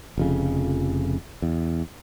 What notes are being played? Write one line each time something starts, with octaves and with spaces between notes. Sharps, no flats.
F1 F2 C#3
E2